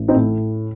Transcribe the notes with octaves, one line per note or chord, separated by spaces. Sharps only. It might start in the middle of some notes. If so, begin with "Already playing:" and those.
Already playing: A1
C4 D#4
A2